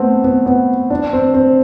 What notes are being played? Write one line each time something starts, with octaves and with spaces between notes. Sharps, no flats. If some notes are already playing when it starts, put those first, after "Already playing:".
Already playing: A3 B3 C4
B3
B3
D4
C4
C4